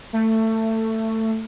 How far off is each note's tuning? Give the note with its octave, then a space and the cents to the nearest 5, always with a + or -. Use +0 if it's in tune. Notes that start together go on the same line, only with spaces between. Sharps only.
A3 +20